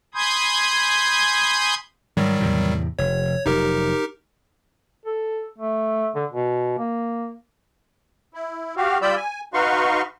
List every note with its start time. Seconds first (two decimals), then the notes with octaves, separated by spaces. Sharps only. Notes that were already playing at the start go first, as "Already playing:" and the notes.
0.14 G#5 B5 C6 D#6 G6 G#6
2.17 G#2 D#3 F#3 G3
2.40 E2 A2 C3
2.99 F1 C#5
3.46 F1 F#3 D#4 G4 A#4
5.06 A4
5.58 A3
6.15 D3
6.31 B2
6.78 A#3
8.34 E4
8.77 F#4 G4 F5
9.02 G3 F4 D5 B5 E6 G6
9.16 G#5
9.54 D#4 F#4 B4 F5 C6 C#6